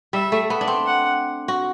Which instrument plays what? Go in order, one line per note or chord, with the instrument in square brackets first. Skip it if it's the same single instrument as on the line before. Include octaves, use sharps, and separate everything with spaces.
[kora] G3 [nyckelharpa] E5
[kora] A3
B3
D4
C4
[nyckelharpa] F#5
[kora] F#4